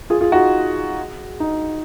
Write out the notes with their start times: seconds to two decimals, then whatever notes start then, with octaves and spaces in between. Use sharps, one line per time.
0.10 F4 G#4
0.21 F4 G#4
0.32 D#4 F#4
1.40 D#4